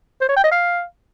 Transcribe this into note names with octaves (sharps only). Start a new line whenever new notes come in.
C5
C#5
G5
D#5
F5